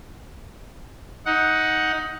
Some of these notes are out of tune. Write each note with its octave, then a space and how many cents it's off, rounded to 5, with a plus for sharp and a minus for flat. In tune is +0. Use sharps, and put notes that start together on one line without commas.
D#4 +15 F#5 +0